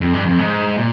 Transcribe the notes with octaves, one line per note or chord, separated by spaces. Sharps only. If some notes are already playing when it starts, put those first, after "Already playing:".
F2
G2
F2
G#2
A#2